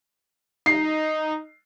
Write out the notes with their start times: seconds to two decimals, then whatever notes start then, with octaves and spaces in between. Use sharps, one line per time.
0.66 D#4 C7